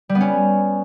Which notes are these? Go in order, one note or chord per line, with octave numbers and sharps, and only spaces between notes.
G3
B3
C#4